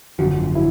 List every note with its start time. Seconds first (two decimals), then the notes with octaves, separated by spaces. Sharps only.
0.19 G#1 F#2 D3 F3 F#4
0.55 E4